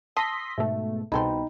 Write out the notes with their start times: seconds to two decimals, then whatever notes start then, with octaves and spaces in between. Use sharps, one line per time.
0.17 A5 C6 D#6 E6 A#6 B6 G7
0.58 G#2 B2 A3 E5
1.12 C2 B2 D#4 G#4 A4 C5 G5 B5